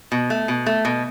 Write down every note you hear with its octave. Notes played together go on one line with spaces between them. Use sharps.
B2
A3
B2
A3
B2